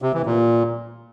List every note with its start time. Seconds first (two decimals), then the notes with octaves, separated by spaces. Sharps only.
0.02 C3
0.14 E3
0.26 A#2